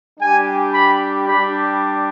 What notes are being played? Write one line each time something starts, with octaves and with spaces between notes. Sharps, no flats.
G3 D4 G4 G#5
B5
G3 D4 G4 B5